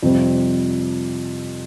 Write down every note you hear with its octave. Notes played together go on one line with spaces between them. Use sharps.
F2 C3 G3 C4